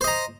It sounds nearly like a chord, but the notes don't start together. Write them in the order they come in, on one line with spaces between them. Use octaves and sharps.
C5 D#5 A#5